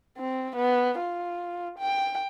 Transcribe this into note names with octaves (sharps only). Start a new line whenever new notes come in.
C4
B3
F4
G5